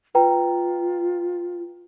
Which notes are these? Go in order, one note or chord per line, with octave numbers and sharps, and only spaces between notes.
F4 B4 G5 A#5